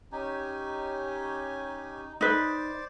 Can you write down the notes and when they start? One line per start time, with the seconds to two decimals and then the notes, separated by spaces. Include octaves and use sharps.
0.12 C#4 D#4 G4 G#5
2.21 D#4 B4 C5 D5 D#5 D6